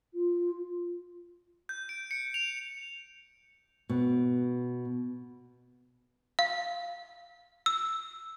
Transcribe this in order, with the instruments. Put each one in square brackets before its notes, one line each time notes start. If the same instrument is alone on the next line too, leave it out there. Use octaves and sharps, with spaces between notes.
[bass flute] F4
[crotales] G6
D7
C#7
F7
[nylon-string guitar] B2
[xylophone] F5
E6